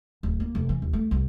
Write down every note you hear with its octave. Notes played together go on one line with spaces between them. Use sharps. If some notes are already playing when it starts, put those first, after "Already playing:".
D1
A#3
F1
E3
D#2
A3
C2